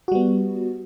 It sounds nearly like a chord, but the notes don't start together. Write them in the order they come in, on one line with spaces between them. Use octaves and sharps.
F#4 G3 B3